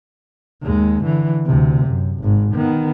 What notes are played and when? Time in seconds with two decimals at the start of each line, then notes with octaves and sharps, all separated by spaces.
0.62 D#2 G#3
1.04 D3 E3
1.45 D2 C3
1.87 F#2
2.20 G#1 G#2
2.54 D#3 B3